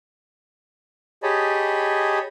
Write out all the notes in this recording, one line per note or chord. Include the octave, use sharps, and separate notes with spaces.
G4 G#4 C#5 D#5 A5 B5